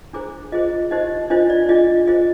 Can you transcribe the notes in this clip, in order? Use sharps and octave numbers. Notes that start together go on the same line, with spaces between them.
D4 G#4 C5 A#5 D6
F4 G#4 C5 D#5
D#4 G4 C5 D#5
D4 F4 C5 D#5
D5
D4 F4 G#4 D#5
F4 G#4 C5 D#5